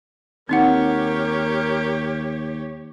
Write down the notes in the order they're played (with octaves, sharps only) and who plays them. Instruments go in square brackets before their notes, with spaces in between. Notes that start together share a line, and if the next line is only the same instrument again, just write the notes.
[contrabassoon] D#2 [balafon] C4 D#4 F#5 [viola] G4 C#5 [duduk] A#4